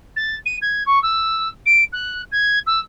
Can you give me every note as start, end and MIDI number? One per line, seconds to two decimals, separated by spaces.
0.16 0.35 93
0.45 0.56 99
0.61 0.83 92
0.86 1.01 85
1.02 1.48 88
1.65 1.84 98
1.92 2.22 90
2.31 2.59 92
2.66 2.79 88